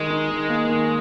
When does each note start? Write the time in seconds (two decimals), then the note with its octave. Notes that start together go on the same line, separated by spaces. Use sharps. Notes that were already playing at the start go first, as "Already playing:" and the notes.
Already playing: D#3 G#3
0.10 D#4
0.30 D#3
0.49 A#3
0.69 D#3